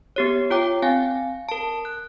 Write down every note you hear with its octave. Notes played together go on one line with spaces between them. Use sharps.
B3 G4 C#5
F4 C#5 G5 D6
C4 F5 G#5
A#4 A5
F#6